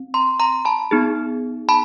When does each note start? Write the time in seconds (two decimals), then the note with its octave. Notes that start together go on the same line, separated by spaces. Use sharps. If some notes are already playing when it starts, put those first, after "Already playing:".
Already playing: C4
0.14 A#5 C6
0.40 A#5 C6
0.65 A5 B5
0.91 B3 D#4 G#4
1.69 A5 B5